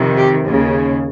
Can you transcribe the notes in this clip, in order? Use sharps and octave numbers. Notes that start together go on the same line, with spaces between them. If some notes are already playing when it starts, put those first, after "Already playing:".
Already playing: F2 C3 D#3
G4
D#2 C#3